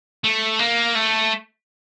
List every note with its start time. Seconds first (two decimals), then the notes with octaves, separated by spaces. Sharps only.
0.24 A3
0.59 A#3
0.95 A3